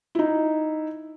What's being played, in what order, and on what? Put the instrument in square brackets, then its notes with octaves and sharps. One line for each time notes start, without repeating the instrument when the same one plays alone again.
[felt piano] D#4 E4